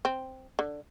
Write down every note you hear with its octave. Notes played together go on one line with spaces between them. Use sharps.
C4
D3